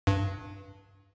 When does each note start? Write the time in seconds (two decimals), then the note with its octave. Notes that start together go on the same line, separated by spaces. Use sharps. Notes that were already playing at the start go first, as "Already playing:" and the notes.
0.07 G2